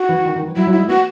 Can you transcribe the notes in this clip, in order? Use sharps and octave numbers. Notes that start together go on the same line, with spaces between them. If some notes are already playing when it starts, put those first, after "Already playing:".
Already playing: F#4
E3
D#3
D#3
E3
F#3 E4
F#3
E4
G#3
B3 F#4